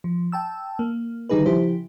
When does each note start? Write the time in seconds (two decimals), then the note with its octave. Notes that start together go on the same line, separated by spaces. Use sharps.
0.04 F3
0.32 G5 A5 E6
0.79 A#3
1.29 D3 D#3 G3 D#4 G#4 B4
1.46 C#3 F3 E4 G4 C5